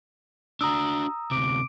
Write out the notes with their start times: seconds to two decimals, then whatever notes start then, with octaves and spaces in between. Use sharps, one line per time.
0.61 D4 F#4 A#5 D#6 E6
1.31 D2 C3 D6